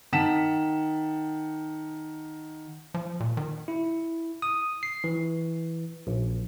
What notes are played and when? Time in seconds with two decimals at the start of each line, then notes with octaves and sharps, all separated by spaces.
0.13 D#3 F#5 A5 B6 E7
2.94 F3
3.20 A#2
3.37 D#3
3.68 E4
4.42 D#6
4.83 C7
5.04 E3
6.07 A#1